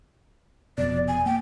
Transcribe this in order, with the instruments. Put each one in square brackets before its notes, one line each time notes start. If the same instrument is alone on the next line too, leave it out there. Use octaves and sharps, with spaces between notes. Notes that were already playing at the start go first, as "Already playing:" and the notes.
[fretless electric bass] F1 F2 B2 [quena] D5
[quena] G#5
[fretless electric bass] A#3 [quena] G5